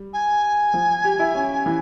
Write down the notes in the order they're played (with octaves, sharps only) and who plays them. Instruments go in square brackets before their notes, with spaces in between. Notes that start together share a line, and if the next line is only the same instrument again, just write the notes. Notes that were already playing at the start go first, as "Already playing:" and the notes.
Already playing: [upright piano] G3
[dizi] G#5
[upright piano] F3
G4
E4
C#4
E3